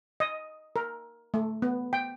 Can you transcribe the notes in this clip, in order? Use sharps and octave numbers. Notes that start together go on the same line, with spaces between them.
D#5
A#4
A3
B3
G5